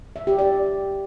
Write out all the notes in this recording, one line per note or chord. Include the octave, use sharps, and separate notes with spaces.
E5
G4
D5